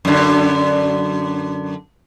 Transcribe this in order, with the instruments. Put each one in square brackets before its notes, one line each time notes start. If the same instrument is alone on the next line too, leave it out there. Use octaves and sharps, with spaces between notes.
[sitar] F#2 D3